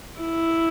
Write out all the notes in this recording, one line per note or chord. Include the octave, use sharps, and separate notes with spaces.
E4